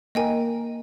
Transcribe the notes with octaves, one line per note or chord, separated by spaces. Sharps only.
A#3 A#4 D#5 G5 G#5